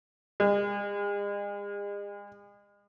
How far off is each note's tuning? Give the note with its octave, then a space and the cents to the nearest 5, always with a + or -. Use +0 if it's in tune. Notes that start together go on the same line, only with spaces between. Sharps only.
G#3 -40